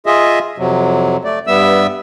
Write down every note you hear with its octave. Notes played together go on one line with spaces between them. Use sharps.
F4 G#4 D#5 E5
F2 C3 F#3
A3 D5
G2 G3 B3 E5 E6